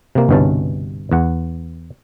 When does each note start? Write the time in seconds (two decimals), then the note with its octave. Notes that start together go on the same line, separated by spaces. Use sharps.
0.15 C3 A#3
0.29 G1 C2 G2 B2 C#4 A5
1.12 E2 F#5